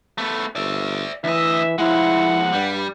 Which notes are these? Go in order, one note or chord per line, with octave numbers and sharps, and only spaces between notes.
A3 B3
G1 D5 E5
D2 E3 D#5 E5
F3 G#3 E4 F#5
G2 G3